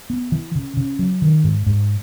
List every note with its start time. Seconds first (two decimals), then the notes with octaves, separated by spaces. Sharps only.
0.10 B3
0.32 E3
0.55 C#3
0.77 C#3
0.99 F#3
1.22 D#3
1.44 G#2
1.66 G#2